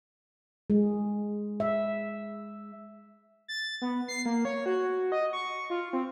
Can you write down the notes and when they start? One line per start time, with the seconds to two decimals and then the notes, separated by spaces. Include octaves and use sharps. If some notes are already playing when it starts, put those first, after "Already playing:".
0.70 G#3
1.60 E5
3.48 A6
3.82 B3
4.08 C7
4.25 A#3
4.45 C#5
4.66 F#4
5.12 D#5
5.33 C#6
5.70 F4
5.93 C4